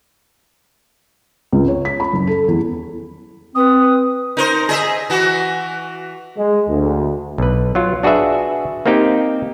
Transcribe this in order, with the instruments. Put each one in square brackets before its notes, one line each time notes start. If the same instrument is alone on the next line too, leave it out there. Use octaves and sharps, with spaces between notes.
[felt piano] C#2
C#5
B6
B5
F#1
A4
E2
[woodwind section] C4 B4 [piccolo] D#6
[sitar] D#4 A#4 C5
G#4 D#5 E5
E3 F#4
[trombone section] G#3
D2
[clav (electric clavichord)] B1 B4
F#3 F4
D4 F#4 G#4 B4 E5
A#3 C4 D#4 G4 G5